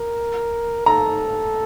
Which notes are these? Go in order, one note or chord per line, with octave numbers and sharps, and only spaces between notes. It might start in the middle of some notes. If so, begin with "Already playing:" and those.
Already playing: A#4
A4 A#5